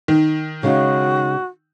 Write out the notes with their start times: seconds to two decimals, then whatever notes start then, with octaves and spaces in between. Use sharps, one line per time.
0.08 D#3
0.63 C#3 G#3 D#4 F#4